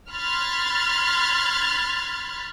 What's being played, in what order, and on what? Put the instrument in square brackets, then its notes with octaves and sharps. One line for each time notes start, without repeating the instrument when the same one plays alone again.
[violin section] B5 C6 F6 F#6 G#6 A6